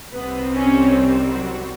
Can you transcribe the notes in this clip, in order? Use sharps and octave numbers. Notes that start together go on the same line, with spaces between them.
C2 C3 D#3 G3 B3 C4 B4
C#4 C#5
F#3 F#4